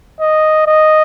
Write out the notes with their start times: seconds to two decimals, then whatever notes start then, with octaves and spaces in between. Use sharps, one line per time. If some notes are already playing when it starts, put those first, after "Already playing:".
0.21 D#5
0.67 D#5